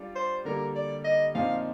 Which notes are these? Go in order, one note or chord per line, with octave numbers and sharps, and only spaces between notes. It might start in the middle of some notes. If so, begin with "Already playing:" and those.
Already playing: G3 D4 F4
C5
D3 G3 A#3 A#4
D5
D#5
A#2 F3 C4 D#4 F5